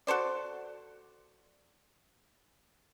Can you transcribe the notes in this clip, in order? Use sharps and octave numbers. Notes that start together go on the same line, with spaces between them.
F#4 A4 C5 D5